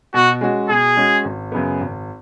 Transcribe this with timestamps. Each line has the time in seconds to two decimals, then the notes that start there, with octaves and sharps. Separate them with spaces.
0.14 B2 F#4
0.41 G#3 C#4 F#4
0.69 B2 G#4
0.97 G#3 C#4 F#4
1.25 G#1
1.52 F#2 C#3 B3
1.80 G#1